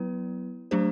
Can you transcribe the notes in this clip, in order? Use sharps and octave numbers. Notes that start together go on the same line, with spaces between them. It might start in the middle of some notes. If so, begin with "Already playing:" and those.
Already playing: F#3 B3 E4 B4
F#3 A3 D4 G4 C5